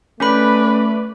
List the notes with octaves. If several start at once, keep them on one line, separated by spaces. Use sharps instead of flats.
A3 C#4 B4 D5 B5